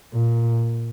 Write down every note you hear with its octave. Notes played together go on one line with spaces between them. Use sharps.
A#2